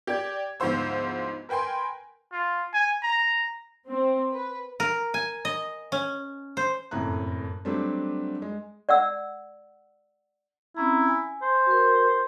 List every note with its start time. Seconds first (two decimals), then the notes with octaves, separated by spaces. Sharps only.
0.07 G4 D5 G#6
0.60 D2 G#2 F3 B3 C5 E6
1.49 A#4 B4 G5 G#5 C6
2.32 F4
2.73 G#5
3.03 A#5
3.87 C4
4.32 B4
4.80 A#4
5.14 G#5
5.45 D#5
5.92 C#4
6.57 C5
6.91 F#1 F2 A2 C#4 A#5 F#6
7.65 F#3 G3 A3 C4 D4
8.42 G#3
8.89 D5 F#5 E6
10.77 C4 C#4 E4 A#5
11.08 G#5
11.42 C5
11.66 F#4 A#4